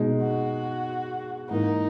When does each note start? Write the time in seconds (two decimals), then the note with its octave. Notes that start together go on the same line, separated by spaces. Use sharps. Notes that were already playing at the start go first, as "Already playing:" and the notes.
Already playing: B2 G#3 D#4
0.22 F#4
1.50 G#2 E3 A#3 D#4